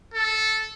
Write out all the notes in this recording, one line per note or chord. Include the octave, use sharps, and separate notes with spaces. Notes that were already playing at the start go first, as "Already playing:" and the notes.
A4